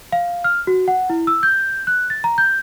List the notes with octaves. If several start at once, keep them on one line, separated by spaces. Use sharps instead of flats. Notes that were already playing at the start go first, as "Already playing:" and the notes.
F5
F6
F#4
F#5
E4
E6
G6
F#6
A6
A#5
G6